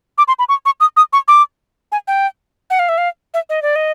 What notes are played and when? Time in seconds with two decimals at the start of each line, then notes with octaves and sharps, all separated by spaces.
0.18 D6
0.28 C6
0.39 B5
0.49 C#6
0.66 C#6
0.80 D#6
0.97 D#6
1.13 C#6
1.28 D6
1.92 G#5
2.08 G5
2.70 F#5
2.79 F5
2.89 E5
2.98 F5
3.34 E5
3.49 D#5
3.62 D5
3.76 D#5